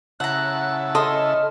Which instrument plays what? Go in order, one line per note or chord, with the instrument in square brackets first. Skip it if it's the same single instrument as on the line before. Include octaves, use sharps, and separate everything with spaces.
[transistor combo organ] C#3 E4 A5 [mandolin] F#5 A#5 [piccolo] F#6
[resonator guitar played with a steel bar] A4 [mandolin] D#5 C6 D#6 [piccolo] F6